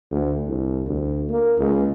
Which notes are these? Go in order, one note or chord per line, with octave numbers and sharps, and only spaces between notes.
D2
C2
D2
A#3
C#2